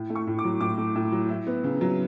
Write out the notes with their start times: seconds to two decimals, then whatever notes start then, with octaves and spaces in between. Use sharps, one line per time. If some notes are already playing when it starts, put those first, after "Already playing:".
Already playing: A2
0.10 A3
0.16 C#6
0.27 A2
0.39 D6
0.44 F#3
0.61 A2 D6
0.78 A3
0.95 A2
1.12 F#3
1.29 E4
1.47 B3
1.64 C#3
1.81 F#3